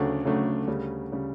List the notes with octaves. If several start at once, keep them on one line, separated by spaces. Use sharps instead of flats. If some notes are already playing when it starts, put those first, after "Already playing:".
Already playing: D2 C#3 F#3 A3 D4
D2 C#3 F#3 A3 D4
D2 C#3 G3
C#3 G3